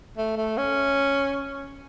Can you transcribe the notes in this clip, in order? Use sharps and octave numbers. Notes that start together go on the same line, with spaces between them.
A3
A3
C#4